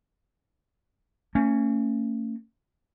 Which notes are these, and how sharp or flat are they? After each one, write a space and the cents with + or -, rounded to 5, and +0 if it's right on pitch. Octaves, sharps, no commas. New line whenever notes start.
A3 +45 C#4 +0